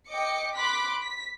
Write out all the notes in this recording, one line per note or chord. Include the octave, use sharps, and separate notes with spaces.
D#5 G5 D6 C#7
B5 C6 D6 F#6 B6
B6